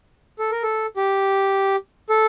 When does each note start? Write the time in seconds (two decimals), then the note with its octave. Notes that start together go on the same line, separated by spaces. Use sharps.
0.39 A4
0.51 A#4
0.63 A4
0.97 G4
2.10 A4